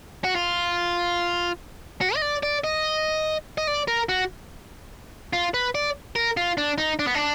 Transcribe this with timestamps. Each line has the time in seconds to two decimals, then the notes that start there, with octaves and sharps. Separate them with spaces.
0.24 F#4
0.35 F4
2.01 F#4
2.15 D#5
2.22 D5
2.43 D5
2.64 D#5
3.58 D#5
3.67 D5
3.88 A#4
4.09 F#4
5.33 F4
5.54 B4
5.75 D5
6.16 A#4
6.37 F4
6.58 D4
6.78 D#4
6.99 D4
7.07 B3
7.15 D4